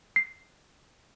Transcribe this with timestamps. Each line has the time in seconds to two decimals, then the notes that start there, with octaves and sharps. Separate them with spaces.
0.16 C7